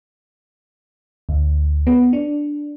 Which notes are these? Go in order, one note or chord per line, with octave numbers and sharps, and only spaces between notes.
D2
B3
D4